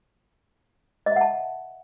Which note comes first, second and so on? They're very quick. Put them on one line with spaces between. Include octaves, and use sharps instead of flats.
D#5 E5 F#5 A5